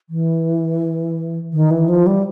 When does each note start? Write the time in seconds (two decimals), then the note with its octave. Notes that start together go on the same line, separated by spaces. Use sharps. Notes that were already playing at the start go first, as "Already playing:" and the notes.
0.09 E3
1.53 D#3
1.70 E3
1.88 F3
2.06 G3